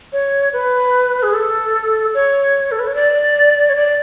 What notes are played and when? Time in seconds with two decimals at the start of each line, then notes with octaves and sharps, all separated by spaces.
0.13 C#5
0.53 B4
1.23 G#4
1.34 A4
2.14 C#5
2.71 A4
2.79 B4
2.87 C#5
2.95 D5
3.69 C#5
3.75 D5